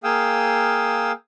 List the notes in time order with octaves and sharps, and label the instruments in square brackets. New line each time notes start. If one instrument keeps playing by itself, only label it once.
[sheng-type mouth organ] A#3 G#4 F5 G5 D#6 E6